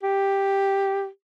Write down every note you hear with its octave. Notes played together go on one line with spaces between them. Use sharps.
G4